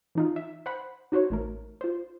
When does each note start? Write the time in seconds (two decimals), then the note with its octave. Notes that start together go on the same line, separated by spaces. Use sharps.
0.15 E3 D#4 F4
0.36 E5
0.66 C5 F#5 B5
1.12 D#4 F#4 C5 C#5
1.30 A1 A3 A#4
1.81 F4 C5